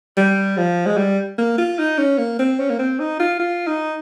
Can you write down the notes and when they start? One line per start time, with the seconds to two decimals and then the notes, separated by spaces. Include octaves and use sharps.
0.17 G3
0.57 F3
0.86 G#3
0.97 G3
1.38 A#3
1.58 F4
1.79 D#4
1.98 C#4
2.18 A#3
2.39 C4
2.59 C#4
2.70 A#3
2.79 C4
3.00 D#4
3.20 F4
3.39 F4
3.67 D#4